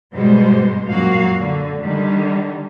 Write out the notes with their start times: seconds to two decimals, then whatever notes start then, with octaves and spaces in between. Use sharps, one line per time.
0.12 G#2 B2 G3 G#3 C5
0.87 F#2 A#2 A#3 F#4 F5
1.39 D3
1.82 D3 D#3 G3